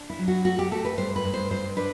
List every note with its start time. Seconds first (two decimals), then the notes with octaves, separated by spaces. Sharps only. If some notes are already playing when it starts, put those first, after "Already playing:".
Already playing: D4
0.10 E4
0.19 F#3
0.28 F#4
0.44 A3 F#4
0.59 G4
0.71 A3 A4
0.85 B4
0.97 G2 C5
1.16 B4
1.25 G2
1.34 C5
1.51 G2 C5
1.77 D4 B4